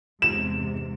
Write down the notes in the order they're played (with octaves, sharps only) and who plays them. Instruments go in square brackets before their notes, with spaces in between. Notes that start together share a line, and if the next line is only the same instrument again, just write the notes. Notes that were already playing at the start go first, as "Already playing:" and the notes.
[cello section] E2 G#2 C3 [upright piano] E7